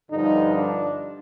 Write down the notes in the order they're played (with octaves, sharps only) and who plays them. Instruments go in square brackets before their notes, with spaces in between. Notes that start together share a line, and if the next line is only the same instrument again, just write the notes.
[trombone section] G2 D3 F3 D#4
D4